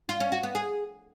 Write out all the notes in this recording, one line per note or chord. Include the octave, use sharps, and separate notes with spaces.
F4
C#4
F#4
B3
G#4